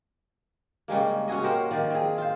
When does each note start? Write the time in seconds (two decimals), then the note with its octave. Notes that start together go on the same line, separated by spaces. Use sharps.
0.88 C#3 G3 G#3 A#3
1.28 C#4 F#4 G#4 D#5
1.43 G4 A#4 C5 F#5
1.71 D#3 F3 D5
1.91 C4 G#4
2.18 F4 C5